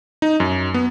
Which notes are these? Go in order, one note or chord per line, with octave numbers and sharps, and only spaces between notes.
D#4
F#2
B3